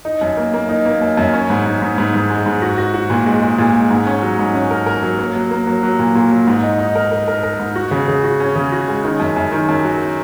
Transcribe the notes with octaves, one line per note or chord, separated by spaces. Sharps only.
D#4
F#2
A#3
A#3
D#4
A#3
F#2
F#2
C#4
G#2
G#2
G#2
G#2
G#2
G#3
G#2
F#4
F#4
F#4
A#2
G#3
G#3
A#2
G#3
G#2
C#4
F#3
G#2
C#4
A#4
A#4
F#3
A#3
F#3
A#3
F#3
F#3
A#2
A#2
F#3
G#2
D#4
D#4
A#4
A#4
A#4
A#4
G#2
F#4
C#3
C#3
F#4
C#4
C#3
F#4
G#3
D#3
F#2
F#2
D#3
F#2
F#3